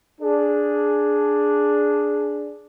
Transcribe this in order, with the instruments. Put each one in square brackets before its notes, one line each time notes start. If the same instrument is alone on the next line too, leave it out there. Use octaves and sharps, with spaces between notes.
[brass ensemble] D4 G#4